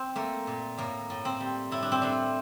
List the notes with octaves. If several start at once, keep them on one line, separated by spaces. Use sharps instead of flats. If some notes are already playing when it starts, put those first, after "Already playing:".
Already playing: C4
A3 A#3
A#2
A2 A#3
A2
C4
G3
A2 E4
D4
C4
A3 D4